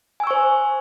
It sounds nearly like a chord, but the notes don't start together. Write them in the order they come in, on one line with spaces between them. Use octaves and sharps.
G#5 E6 C#6 C5